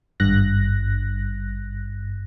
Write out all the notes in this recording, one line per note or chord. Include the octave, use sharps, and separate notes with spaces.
G#1 G2 F#6 A#6